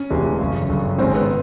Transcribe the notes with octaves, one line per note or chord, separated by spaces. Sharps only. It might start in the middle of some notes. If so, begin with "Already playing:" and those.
Already playing: C#4
E1 D2 C3 E3 G#3
G1 F#2 C#3
G1 F#2 C#3
G#1 G#2 D#3 G#3 C4 C#4
B3